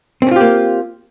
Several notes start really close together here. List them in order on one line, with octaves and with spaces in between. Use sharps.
C4 C#4 F4 G4 A#3